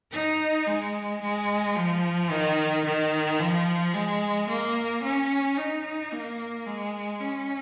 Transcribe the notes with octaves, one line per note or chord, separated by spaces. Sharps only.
D#4
G#3
G#3
F3
D#3
D#3
F3
G#3
A#3
C#4
D#4
A#3
G#3
C#4